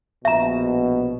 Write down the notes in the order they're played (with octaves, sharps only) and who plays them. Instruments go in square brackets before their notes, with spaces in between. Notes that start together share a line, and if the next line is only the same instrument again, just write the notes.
[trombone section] A#1 B2 [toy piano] E5 A#5